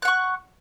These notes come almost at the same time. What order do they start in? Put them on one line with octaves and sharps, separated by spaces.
F#6 F#5 C#6